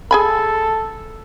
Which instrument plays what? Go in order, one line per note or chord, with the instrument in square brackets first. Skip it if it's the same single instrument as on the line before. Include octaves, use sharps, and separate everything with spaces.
[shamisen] G#4 G#5 B5 [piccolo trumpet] A4